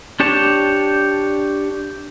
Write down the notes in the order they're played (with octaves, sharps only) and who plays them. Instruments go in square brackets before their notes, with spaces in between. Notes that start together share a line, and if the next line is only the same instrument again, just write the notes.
[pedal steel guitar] D4 G4 C#5 A5